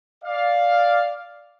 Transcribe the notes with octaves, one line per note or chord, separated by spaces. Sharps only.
D5 F5